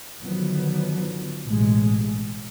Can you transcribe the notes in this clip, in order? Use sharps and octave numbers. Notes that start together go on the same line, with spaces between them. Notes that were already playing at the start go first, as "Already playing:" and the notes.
D3 D#3 F3 F#3 B3
A1 B2 G#3